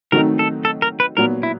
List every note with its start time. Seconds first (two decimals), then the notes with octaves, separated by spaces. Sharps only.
0.12 D#3 F#3 A3 C4 D#4 A#4
0.39 A4
0.65 A4
0.82 A#4
1.00 B4
1.17 A#2 F#3 B3 A#4
1.43 E4